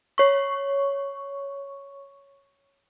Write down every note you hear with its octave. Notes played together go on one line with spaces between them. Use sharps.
C#5 C#6